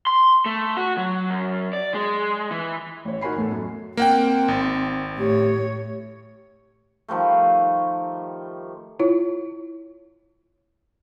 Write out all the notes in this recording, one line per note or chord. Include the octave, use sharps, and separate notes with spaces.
C6
A3
F#4
F#3
F#2
D5
G#3
E3
A1 C#5
D#4 F#4 A#4 G#5 B5 C7
E2 A2 A4
F#2
A#3 C4 F#5 G5
G#1
A2 G4 C#5
D#3 F3 G3 A3
E4 F4 C#5